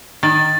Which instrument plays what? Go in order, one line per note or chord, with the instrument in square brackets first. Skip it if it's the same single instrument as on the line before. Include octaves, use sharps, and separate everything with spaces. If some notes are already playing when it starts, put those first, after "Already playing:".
[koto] D#3 [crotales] A6